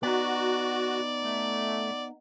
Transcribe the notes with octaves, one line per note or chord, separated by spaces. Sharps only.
B3 D#4 F#4 D5
A3